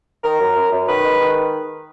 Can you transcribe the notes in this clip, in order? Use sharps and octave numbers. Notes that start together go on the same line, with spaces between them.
D#3 A#4
F#2
F#2
F#2
D#3 B4
G#3
D#3